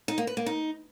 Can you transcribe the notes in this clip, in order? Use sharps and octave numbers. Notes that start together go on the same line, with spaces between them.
D#4
A#3
B4
A#3
D#4